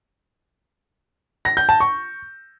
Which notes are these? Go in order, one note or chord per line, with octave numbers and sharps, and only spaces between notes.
A#6
G6
A5
C#6